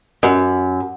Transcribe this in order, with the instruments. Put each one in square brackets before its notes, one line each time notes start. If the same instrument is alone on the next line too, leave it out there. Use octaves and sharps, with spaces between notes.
[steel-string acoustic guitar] F#2